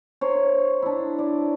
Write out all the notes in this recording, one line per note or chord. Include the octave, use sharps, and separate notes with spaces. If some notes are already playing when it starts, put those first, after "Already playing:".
A#4 C5 C#5
D4 E4
D5